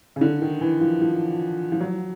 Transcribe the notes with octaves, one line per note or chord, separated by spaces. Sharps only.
C#3
D3
D#3
E3
F3
F3
F3
F#3